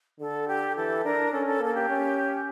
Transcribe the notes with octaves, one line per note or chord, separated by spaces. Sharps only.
D3 A4
G4
E3 A4
D4 A#4
C#4 A4
A4
A#3 A4
G4
C#4